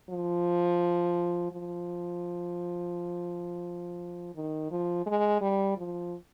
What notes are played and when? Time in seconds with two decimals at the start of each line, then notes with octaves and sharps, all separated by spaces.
0.09 F3
1.51 F3
4.35 D#3
4.71 F3
5.06 G#3
5.41 G3
5.77 F3